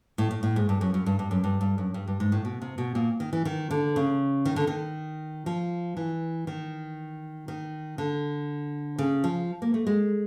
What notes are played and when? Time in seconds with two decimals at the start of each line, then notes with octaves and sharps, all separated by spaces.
0.18 A2
0.31 A2
0.43 A2
0.56 G#2
0.69 G2
0.81 F#2
0.94 F#2
1.06 G2
1.19 G2
1.31 F#2
1.44 G2
1.61 G2
1.78 F#2
1.94 G2
2.07 G2
2.20 G#2
2.32 A2
2.45 B2
2.62 C3
2.78 B2
2.95 A#2
3.20 D#3
3.33 E3
3.45 D#3
3.71 D3
3.96 C#3
4.45 D#3
4.56 D3
4.67 D#3
5.46 F3
5.97 E3
6.47 D#3
7.48 D#3
7.98 D3
8.98 C#3
9.24 F3
9.62 A#3
9.74 A3
9.87 G#3